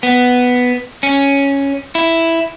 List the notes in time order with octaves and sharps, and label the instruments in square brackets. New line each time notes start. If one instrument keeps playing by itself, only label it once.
[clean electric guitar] B3
C#4
E4